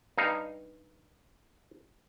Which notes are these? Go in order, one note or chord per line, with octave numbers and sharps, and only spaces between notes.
G2 D#4 F5